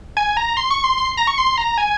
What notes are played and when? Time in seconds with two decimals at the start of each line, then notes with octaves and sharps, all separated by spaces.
0.17 G#5
0.37 A#5
0.57 C6
0.71 C#6
0.84 C6
0.97 C6
1.17 A#5
1.27 C#6
1.38 C6
1.58 A#5
1.78 G#5